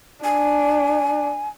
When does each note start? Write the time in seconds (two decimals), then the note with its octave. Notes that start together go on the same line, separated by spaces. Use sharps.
0.24 D4 G#5